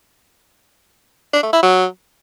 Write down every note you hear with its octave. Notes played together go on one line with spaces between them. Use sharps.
D4
A3
E4
F#3